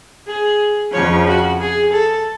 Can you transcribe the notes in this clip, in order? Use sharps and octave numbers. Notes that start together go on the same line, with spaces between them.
G#4
F2 C#3 F3 C#5
F#4
G#4
A4